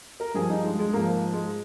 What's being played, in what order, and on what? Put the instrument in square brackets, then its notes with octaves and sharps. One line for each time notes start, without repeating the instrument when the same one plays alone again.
[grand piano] A#4
G2 F3 G#4
D#4
G#3
G#3
G#2 F3 A#3
G#3